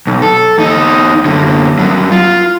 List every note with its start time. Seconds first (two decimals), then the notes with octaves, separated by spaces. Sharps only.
0.07 B1
0.22 A4
0.58 E2 D#4
1.25 F#2 D3
1.79 G2 F#3
2.12 F4